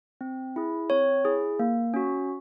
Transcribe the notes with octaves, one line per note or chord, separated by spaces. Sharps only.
C4
E4 G#4
C4 C#5
E4 G#4
A#3
C#4 F#4